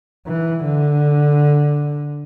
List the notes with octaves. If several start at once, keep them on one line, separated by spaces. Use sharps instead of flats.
E3
D3